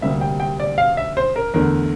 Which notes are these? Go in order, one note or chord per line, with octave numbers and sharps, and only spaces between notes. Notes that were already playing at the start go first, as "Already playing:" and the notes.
D2 C3 G3 A#3 E5
G5
G5
D5
F5
E5
C5
A#4
E2 D3 A3 A#4